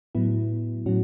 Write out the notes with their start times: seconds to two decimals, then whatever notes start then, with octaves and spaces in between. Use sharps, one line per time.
0.15 A2 F#3 B3 E4
0.86 A2 F#3 C#4 F#4